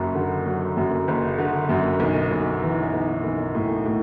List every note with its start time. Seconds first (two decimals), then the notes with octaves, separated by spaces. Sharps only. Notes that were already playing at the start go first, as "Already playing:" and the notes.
Already playing: F#1 F#2
0.15 D3
0.46 F#3
0.77 F#2
1.08 F#1
1.38 D3
1.69 F#2
2.00 B1
2.31 B1
2.62 E3
2.93 B1
3.24 B1
3.55 A2
3.86 A2